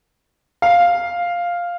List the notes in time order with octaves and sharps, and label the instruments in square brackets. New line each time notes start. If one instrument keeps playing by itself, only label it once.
[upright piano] F5